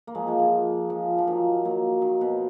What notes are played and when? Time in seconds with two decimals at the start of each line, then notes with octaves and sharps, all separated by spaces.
0.07 A#3
0.15 F3 G#3
0.27 F3 G#3
0.39 F3
0.90 F3
1.18 F3
1.27 D#3 F#3
1.65 F#3 A#3
2.02 D#3
2.21 B2